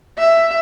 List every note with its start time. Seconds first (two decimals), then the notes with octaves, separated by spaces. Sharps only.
0.18 E5